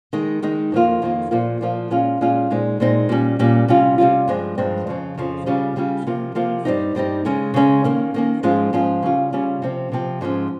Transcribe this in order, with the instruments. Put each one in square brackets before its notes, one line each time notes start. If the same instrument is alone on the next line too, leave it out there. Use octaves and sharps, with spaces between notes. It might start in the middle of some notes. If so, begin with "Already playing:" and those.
[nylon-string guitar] D#3 G#3 D#4
D#3 G#3 D#4
F2 D#3 A#3 F4
F2 D#3 A#3 F4
A#2 F3 A#3 F4
A#2 F3 A#3 F4
A#2 G#3 C#4 F4
A#2 G#3 C#4 F4
A#2 G#3 C4 D#4
A#2 G#3 C4 D#4
A#2 G3 C#4
A#2 G3 C#4
C3 G3 C#4 F4
C3 G3 C#4 F4
G2 F3 G#3 C4
G2 F3 G#3 C4
F2 C#3 F3
F2 C#3 F3
C#3 G3 C#4 F4
C#3 G3 C#4 F4
C3 F3 A#3 F4
C3 F3 A#3 F4
G2 G3 C4 D#4
G2 G3 C4 D#4
C#3 G#3 C#4
C#3 G#3 C#4
D#3 A#3 C#4
D#3 A#3 C#4
G#2 F3 G#3 C#4 F4
G#2 F3 G#3 C#4 F4
C#3 G3 C#4 F4
C#3 G3 C#4 F4
C3 F3 C4
C3 F3 C4
G#2 F3 G#3 C#4